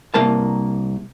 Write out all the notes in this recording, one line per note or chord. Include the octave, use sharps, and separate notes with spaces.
C2 A#3 A#4 A5